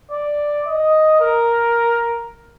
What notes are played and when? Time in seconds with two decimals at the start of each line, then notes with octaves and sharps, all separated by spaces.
0.11 D5
0.66 D#5
1.20 A#4